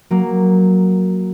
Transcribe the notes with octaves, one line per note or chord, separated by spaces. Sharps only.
F#3 A#3